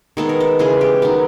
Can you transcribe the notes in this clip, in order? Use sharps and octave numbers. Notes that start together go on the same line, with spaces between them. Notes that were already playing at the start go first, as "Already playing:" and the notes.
D#3 G#3 B3 A4
A#4
A4
C#3 E3 G#3 G#4
G4
D#3 F#3 B3